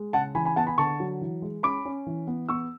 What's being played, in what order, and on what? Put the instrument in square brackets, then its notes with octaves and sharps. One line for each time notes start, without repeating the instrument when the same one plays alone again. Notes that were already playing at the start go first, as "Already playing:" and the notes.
Already playing: [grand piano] G#3
C#3 F#5 A5
E3 G#5 B5
G#5 B5
B3 F#5 A5
G#5 B5
D3 A5 C#6
F#3
E3
G#3
C#4 B5 D6
C#4
E3
B3
B3 C#6 E6